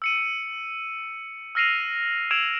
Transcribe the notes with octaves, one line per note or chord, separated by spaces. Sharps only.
E6 C#7 D#7
E6 F6 A#6 C7 D#7 F7
E6 G#6 D7 E7 F7